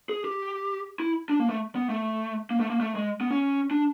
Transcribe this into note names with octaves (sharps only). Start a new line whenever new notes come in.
G#4
G4
E4
D4
A#3
A3
B3
A3
A#3
A3
A#3
A3
G#3
B3
C#4
D4